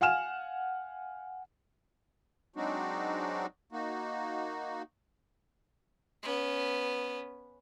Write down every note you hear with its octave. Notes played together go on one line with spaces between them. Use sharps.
F5 F#5 G#5 F6 E7
F#3 G#3 C4 D4 D#4 F#4
A#3 D#4 F#4
B3 C#4